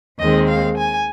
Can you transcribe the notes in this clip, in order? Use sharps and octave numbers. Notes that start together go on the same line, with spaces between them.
D#2 D#3 G#3 C4 D#5
F5
G#5